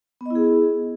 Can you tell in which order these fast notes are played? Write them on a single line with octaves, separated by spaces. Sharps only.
B3 D#5 E4 G#4